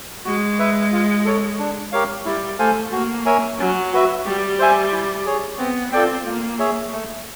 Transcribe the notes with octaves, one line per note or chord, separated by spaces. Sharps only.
G#3 F#4
B4 E5
F4
A4 C#5
D4
G4 A#4 C#5 F5
G3 E4
A3 A4 C5 F5 G#5
A#3 F#4
A#4 C#5 E5 G#5
F#3 C#4
F#4 B4 E5
G3 G4
C5 E5 G#5
E4
G#4 C#5
B3 C4
C4 F4 A4 D5 G5
A#3 F4
G#4 C#5 E5
A3